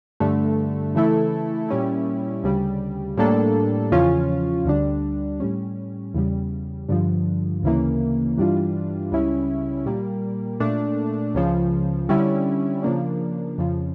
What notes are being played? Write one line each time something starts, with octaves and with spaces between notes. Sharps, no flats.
G2 D3 A3
C#3 E3 A3 E4 A4
A#2 G3 C#4 E4
D2 C#3 G3
A2 G3 A#3 D4 A4
E2 C#3 F3 C#4 F4
D2 D3 G3 D4
A2 G3 C#4
E2 C#3 G3
G2 D3 F3
D2 C#3 E3 A#3
G2 E3 G3 D4 F4
C#2 C#3 G3 C#4 E4
A#2 G3 A#3
A#2 A3 D4
C#2 C#3 F3
D3 G3 C#4 E4
C#3 F3 A#3 D4
F2 C#3 F3